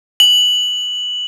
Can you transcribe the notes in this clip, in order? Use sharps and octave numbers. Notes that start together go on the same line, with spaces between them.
F#7